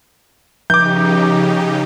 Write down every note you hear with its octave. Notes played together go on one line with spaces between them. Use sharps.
C#3 F3 D#4 G4 D6 G6